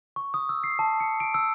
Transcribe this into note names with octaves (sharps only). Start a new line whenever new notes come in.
C#6
D#6
E6
C7
A5
C#7
D7
E6